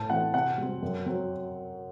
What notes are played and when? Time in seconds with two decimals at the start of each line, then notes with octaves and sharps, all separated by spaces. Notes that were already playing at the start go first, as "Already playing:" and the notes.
Already playing: A2 A5
0.10 E3 A3 C4 F#5
0.34 C3 F#5
0.58 G3 C4
0.83 F#2
1.06 F#3 C4